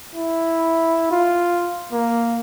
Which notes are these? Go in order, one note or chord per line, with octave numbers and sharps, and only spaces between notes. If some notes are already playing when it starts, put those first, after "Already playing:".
E4
F4
A#3